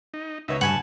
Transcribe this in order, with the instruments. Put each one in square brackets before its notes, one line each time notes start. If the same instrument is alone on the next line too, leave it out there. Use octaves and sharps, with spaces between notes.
[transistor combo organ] D#4
[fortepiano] C#2 B4 C#5 [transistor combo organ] D#4 E5
[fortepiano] D2 B5 C#6 [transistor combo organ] G2 [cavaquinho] F#5 G#5 A5